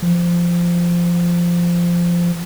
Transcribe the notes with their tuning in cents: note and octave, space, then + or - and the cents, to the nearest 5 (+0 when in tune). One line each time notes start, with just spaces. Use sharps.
F3 -10